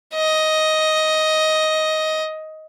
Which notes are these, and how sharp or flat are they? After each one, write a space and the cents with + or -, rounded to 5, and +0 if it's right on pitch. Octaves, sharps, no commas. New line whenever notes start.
D#5 +10